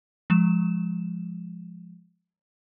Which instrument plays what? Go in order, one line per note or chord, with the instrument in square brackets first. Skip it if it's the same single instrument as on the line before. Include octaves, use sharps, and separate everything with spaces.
[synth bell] F3 G#3 E7